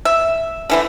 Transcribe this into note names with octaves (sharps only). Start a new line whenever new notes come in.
E5
D3 E3 A3